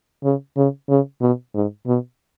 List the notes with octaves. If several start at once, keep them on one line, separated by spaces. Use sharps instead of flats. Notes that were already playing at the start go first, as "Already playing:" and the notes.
C#3
C#3
C#3
B2
G#2
B2